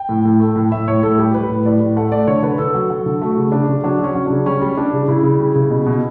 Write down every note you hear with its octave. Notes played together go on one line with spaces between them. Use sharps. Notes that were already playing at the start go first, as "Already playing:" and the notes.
Already playing: G5
A2
A2
A3
A2
A2 E5
A2 C#5
A2 A4
G3 G4
G3 B4
A2
A2 D5
A2
A3 F#5
A3 D5
D3 C#5
D3 B4
D3 A4
F#3
F#3
D3
A3 F#4
C#3
C#3 D4
C#3
F#3 D4
F#3 C#4
F#3
C#3 D4
G3 C#4
G3
G3 D4
C#3
C#3 E4
C#3
G3
C#3
B2
B2